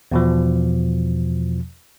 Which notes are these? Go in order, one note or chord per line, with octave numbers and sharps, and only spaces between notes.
E2 B2 F3